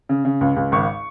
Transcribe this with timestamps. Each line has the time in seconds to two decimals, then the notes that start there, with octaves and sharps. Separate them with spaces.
0.09 C#3
0.25 C#3
0.41 C#2
0.56 C#2
0.72 G#1 C#6